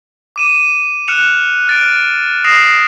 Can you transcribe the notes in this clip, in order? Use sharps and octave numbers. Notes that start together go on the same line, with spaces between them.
D6 D#7 E7
F6 F#6 C#7 E7 F7
F6 A6 D7
D#6 A#6 C7 D7 E7 F7